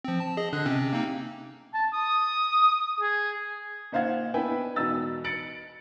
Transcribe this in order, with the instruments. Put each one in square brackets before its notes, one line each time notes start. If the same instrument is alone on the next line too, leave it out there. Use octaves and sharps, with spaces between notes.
[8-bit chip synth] F3 C4
A5
G#4 D#5
D3 D4 F#6
C3 C4 C#4
A#3 C4 D#4
[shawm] A5
D#6
G#4
[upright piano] A#2 D#4 C5 F5 F#5 G#6
B3 D4 E4 B4 G5 G#5
E1 B2 B3 D#4 E6 A6
A6 C#7 D7 F#7